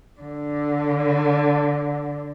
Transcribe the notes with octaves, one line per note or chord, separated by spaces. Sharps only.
D3